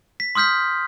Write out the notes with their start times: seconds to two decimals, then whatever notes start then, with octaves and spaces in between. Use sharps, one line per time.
0.20 B6
0.35 C6 D#6 F6 G6 B6